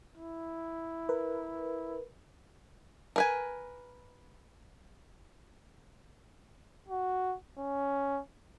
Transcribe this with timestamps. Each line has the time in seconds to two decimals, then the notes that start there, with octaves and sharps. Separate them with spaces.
0.17 E4
1.09 A#4 B4
3.16 A#4 B4 G#5
6.89 F#4
7.58 C#4